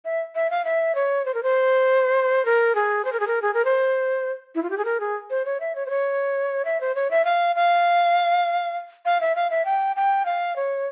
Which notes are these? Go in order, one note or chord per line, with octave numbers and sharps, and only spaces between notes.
E5
E5
F5
E5
C#5
C5
A#4
C5
A#4
G#4
C5
A#4
G#4
A#4
G#4
A#4
C5
E4
F4
G4
G#4
A#4
G#4
C5
C#5
E5
C#5
C5
C#5
E5
C5
C#5
E5
F5
F5
F5
E5
F5
E5
G5
G5
F5
C#5